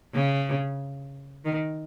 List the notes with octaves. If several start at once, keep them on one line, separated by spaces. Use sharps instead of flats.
C#3
D#3